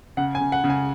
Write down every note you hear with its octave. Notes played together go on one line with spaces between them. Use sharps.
C#3 F#5
G#5
C#3
F#5
C#3
G#5